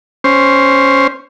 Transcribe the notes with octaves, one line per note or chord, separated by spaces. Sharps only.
C#4 C5